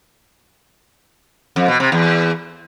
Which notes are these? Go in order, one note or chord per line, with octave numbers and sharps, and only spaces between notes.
F2
B2
C3
E2